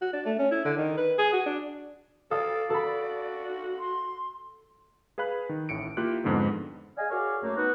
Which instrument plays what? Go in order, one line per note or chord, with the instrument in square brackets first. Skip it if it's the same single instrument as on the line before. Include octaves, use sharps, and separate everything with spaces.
[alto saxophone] F#4
D4
A3
C#4
E4
D3
D#3
B4
G#4
F#4
D4
[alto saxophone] A4 [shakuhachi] D5 [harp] F5 D#6
[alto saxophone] F#4 [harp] A4 B5
[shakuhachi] C6
[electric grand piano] G#4 B4 F5 B5 F#6
D#3
A1 A2 C#7 D7
A#3 E4 F4 G4 F#6
F2 G#2 D3 G#3 B3
[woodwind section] G#4 D5 D#5 F5 G#5
F#4 G#4 A#4 C#5 D5 F5
F#2 A3 A#3
B3 D#4 F#4